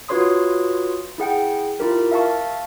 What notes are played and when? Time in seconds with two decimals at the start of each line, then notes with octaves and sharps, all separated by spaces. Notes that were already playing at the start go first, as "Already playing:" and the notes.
0.09 F4 F#4 B4 C#5 C6 D#6
1.18 E4 G#4 F#5 G5
1.80 E4 F4 G4 A#4
2.11 E5 F5 A5 C#6